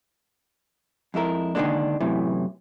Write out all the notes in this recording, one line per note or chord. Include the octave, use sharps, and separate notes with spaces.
F2 G#3 E4 A#4
D3 D#3 F#3 G#3 A#3 D4
F#2 A2 C3 E3